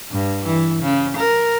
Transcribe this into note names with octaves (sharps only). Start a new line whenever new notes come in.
G2
E3
C#3
A#4